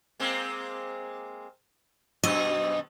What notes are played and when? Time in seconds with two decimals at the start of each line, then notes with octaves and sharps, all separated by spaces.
0.20 G#3 A#3 C4
2.24 F#2 B2 D#5